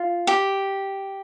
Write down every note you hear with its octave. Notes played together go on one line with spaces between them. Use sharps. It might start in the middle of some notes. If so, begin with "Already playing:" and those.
Already playing: F4
G4